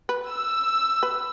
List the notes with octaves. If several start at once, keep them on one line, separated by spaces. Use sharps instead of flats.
B4
E6
B4